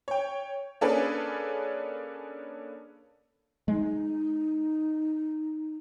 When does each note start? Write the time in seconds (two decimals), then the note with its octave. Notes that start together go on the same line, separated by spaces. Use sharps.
0.08 C#5 G5
0.81 A#3 C#4 D4 G#4 A4 B4
3.68 G#3 D#4